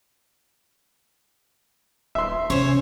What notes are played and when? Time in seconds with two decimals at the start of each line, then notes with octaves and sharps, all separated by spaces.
2.15 D#1 E5 C6
2.50 C3 C#4 C5 C#5